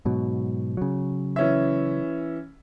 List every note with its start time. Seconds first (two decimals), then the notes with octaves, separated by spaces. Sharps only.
0.05 G#2 B2 F#3
0.77 C#3 F#3
1.36 E3 C#4 E5